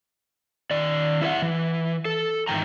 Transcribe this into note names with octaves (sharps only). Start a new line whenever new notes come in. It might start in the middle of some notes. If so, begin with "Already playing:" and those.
D#3 D5
E4 F4 B4 E5 F#5
E3
A4
G#2 D#3 E3 G5 A#5